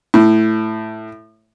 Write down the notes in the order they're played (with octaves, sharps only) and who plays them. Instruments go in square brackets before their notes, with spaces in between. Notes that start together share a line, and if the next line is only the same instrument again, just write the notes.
[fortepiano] A2